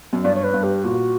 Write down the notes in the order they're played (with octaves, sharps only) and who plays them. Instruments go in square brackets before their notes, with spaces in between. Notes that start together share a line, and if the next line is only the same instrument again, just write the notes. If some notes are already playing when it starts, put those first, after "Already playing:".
[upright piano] F#2
[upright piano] G2 [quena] D5
[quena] C#5
B4
[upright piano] G2
[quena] G4
[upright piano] A#2 [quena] F#4